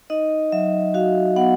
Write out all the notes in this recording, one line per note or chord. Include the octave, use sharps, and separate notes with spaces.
D#4 D#5
F#3 E5
F#4 F5
B3 F#5